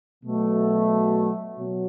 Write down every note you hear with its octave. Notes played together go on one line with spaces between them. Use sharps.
B2 F#3 A3
B2 F#3